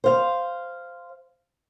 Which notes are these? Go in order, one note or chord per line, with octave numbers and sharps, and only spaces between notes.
C5 F5